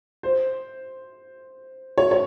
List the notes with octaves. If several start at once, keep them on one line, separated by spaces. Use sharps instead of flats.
C5
C#5
C#5